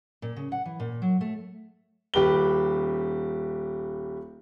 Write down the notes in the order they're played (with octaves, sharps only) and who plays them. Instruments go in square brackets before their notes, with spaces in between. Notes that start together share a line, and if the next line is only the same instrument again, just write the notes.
[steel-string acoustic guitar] A#2
C#3
F#5
E3
A#2
F#3
A3
[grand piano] D#1 G4 B4 G7